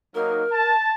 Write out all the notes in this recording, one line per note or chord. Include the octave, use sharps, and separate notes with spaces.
F#3 A#3 D#4 A#4
A5